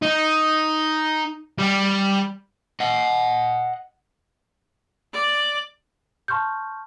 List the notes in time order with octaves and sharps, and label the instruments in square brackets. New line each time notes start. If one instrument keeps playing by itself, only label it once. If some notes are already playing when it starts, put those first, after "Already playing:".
[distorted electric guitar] D#4
G3
[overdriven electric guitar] D#5 F#5
[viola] D5
[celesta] A5 C6 C#6 F6 G6